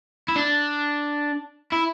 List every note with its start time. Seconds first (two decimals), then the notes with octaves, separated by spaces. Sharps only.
0.28 E4
0.36 D4
1.72 E4